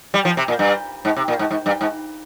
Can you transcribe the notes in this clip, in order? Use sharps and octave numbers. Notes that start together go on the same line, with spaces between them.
G3
F3
C3
A#2
G2
G#2
C3
A#2
G#2
G#2
G2
G#2